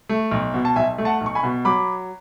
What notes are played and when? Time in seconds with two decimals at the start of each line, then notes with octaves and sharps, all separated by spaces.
0.09 A3
0.31 B1
0.54 B2
0.65 A5
0.76 B1 E5 G#5
0.98 A3
1.05 F#5 A5
1.21 B1
1.26 C#6
1.35 G#5 B5
1.43 B2
1.65 F#3 B5 D6